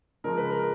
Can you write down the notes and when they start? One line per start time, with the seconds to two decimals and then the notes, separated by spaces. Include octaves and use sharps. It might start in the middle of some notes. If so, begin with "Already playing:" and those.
0.24 C#3 F3 G#3 A#4
0.38 B4
0.51 A#4